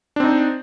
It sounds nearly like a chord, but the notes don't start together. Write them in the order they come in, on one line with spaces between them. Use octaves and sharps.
D4 C4 D#4